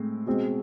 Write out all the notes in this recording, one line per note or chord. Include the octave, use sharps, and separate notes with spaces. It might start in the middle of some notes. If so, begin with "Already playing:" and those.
Already playing: A2 G#3 C4
B2 G#3 C4